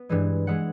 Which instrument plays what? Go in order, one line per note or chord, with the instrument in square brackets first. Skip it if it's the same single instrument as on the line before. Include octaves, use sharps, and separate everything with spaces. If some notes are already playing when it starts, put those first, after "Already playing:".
Already playing: [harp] B3
G2 E3 G#3
E3 G#3 F#5